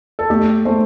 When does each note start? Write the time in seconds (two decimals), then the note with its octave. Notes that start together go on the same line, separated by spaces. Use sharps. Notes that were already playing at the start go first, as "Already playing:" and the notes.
0.19 A4
0.30 A3 G4
0.65 A3 C5